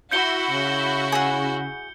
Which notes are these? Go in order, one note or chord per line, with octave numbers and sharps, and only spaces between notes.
E4 F#4 G6 C#7 G7
C#3
G#4 F#5